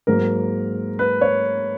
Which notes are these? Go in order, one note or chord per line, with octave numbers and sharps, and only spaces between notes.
G#2 F#3 A#3 A#4
B4
C#5